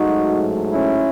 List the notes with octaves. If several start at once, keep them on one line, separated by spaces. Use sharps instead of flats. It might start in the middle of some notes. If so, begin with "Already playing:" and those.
Already playing: A1 G#2 F#3 A3 D#4 F#4
C#4 E4